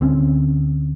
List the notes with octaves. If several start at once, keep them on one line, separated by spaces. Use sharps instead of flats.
D2 C4 C#4